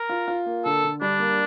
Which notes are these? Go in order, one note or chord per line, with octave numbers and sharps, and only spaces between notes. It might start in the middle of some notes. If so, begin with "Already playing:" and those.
Already playing: A#4
F4
F4
A#3
D3 A4
D3
G3 D4
A#3